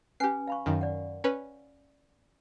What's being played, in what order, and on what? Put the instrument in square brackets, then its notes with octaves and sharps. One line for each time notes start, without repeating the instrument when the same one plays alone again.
[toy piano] C#4 B4 G#5 [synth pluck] G4 C7
[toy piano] F5 B5 C#6
[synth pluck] F#2 D#3
[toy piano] D5 F#5
[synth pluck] C#4 B4